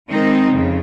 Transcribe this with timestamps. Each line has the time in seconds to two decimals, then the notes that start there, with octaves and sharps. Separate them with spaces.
0.10 D#3 G#3 C4 D#4
0.52 F2 C#3